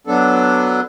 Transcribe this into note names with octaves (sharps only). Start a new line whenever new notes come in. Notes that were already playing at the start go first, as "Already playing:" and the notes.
F#3 B3 D4 A4